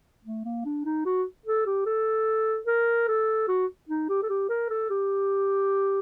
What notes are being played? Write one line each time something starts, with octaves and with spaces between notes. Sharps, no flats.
A3
A#3
D4
D#4
F#4
A4
G4
A4
A#4
A4
F#4
D#4
G4
A4
G4
A#4
A4
G4